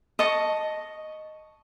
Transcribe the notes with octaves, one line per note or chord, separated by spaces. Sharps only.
D#5 A5 C#6